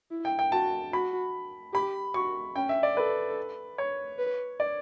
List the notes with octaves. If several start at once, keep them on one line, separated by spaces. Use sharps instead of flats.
E4
G5
G5
F#4 A5
F#4 B5
G4 B5
F#4 C#6
C#4 G5
E5
D5
A4 B4
C#5
B4
D5